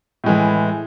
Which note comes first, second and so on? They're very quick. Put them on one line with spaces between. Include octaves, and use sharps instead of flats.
A2 G#3 E3